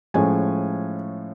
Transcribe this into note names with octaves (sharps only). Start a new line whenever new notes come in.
A2 F3 G#3 C#4 G#5